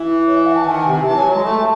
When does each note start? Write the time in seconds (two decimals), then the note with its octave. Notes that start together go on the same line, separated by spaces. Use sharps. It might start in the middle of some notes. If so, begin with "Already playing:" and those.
Already playing: E3
0.27 C#5
0.35 E5
0.46 F#5
0.56 A5
0.64 D#3 G#5
0.71 F#5
0.80 G#5
0.85 C3
1.05 E3 A5
1.14 F#3
1.18 G#5
1.25 F#3
1.31 G#3 A5
1.44 A3 A5